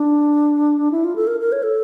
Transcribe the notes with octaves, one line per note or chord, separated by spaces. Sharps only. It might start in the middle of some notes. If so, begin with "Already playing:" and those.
Already playing: D4
E4
F4
A4
A#4
A#4
C#5
A4